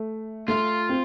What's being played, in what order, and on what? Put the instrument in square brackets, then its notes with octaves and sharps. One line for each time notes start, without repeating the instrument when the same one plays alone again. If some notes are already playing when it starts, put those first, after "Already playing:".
Already playing: [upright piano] A3
[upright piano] A3 [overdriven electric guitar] F4
[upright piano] C4